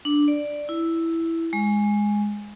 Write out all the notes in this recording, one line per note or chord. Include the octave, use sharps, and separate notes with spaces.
D4
D5
E4
G#3